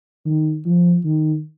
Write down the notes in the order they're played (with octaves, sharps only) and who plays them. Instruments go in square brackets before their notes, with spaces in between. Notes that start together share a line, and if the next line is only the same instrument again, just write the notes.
[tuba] D#3
F3
D#3